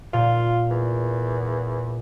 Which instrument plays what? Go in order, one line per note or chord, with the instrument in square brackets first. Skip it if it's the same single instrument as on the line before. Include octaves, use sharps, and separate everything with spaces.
[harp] A#2 [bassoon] F4
[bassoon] E2